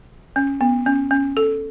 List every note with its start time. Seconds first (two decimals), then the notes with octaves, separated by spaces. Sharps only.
0.36 C#4
0.61 B3
0.86 C#4
1.11 C#4
1.37 A4